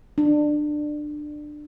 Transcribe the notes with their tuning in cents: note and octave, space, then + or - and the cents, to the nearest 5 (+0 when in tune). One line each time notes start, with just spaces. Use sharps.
D4 +20